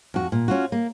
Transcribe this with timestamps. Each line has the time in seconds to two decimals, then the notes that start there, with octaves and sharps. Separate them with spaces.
0.14 F2 F#4
0.32 A#2
0.48 C#4 F4 F#4
0.72 A#3